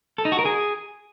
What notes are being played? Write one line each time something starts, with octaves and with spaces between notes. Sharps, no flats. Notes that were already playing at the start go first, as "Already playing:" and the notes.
A4
D#4
F#4
A#4
G#4